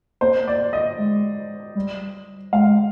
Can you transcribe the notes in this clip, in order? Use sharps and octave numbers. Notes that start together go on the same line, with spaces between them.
A#3 C5
D5
D#5
G#3
G3
G#3 F5